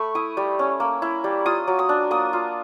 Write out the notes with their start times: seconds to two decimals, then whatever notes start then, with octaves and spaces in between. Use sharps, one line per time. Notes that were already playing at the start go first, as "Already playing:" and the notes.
Already playing: A3 B5 C#6
0.15 E4 D#6
0.37 G3
0.59 C#4
0.80 A#3
1.02 E4
1.24 G3
1.46 F4 D#6
1.68 F#3
1.79 D#6
1.89 D4
2.11 A#3 D#6
2.33 F4